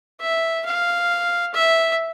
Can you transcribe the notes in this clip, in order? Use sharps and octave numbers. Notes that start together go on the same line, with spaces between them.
E5
F5
E5